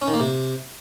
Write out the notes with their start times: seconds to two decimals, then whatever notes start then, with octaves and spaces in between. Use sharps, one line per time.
0.02 C#4
0.08 D#3
0.14 A#3
0.20 C3